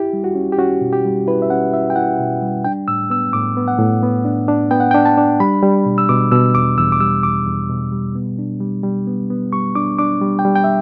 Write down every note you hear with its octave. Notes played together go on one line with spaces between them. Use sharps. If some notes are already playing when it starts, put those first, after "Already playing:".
Already playing: E4 G4
G3
F#4
C#4
G4
C#4 F#4
B2
G4
G3
E4 B4
E5
C#4 F#5
E4 E5
G5
E4 F#5
B2
G3
D4 G5
A2 E6
B3 E6
A2 D6
B3
F#5
A2
B3
D4
D4
B3 G5
F#5
G5
D4
A5
D4
G3 B5
G3
B2
E6
B2 D6
B2 E6
E2 D6
E2 E6
D6
G3 E6
E2 D6
E2
B2
G3
B3
D4
G3
G3
B3
B3
G3 C#6
D4 D6
D4 D6
G3
G5
G3
G5
E5